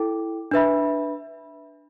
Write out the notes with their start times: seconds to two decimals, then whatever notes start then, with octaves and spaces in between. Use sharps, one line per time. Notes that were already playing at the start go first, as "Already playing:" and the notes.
Already playing: E4 A4 G5 D6
0.51 D4 B4 E5 B5